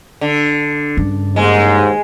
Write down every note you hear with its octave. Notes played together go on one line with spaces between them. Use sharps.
D3
G2 C#3
D#2 G#2 G#3